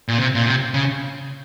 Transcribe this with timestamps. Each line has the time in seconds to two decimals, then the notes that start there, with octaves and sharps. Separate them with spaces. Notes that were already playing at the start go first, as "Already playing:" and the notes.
0.08 A#2
0.18 C3
0.35 A#2
0.46 C3
0.74 C#3